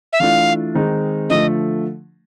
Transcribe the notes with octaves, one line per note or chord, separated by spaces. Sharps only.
E5
E3 A3 D4 F4 F5
D#3 G#3 C4 D#4
D3 F3 A3 D#5